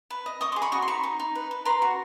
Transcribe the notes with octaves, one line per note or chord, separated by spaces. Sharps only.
B4
D#5
D#5 C#6 D#6
C6 D6
G#4
B5 C#6
F#4 C#6 D#6
C6
D#4 B5 C#6
D#4
D#4
B4
B4
B4 A#5 C6
F#4